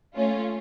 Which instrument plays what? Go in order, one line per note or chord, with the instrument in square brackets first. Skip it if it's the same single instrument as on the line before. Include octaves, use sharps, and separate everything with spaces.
[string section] A3 C#4 F4